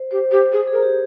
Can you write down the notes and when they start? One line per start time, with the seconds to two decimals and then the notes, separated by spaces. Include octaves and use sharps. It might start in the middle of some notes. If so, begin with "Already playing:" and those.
Already playing: C5
0.11 G4 C5
0.31 G4 C5
0.52 G#4
0.67 G#4 A#4
0.83 G4